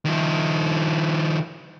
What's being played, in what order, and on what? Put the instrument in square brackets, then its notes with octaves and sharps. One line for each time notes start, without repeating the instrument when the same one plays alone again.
[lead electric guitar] D#3 F3